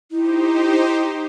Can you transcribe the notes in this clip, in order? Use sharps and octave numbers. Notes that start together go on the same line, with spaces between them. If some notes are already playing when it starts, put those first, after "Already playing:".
D#4 E4 G4 C5